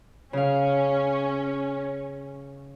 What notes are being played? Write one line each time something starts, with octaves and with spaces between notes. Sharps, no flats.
C#3 C#4 F5